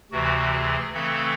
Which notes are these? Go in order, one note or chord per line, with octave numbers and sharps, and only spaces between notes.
D2 C3 E3 F#4
G#4
C#3 E3 A3 C4 A4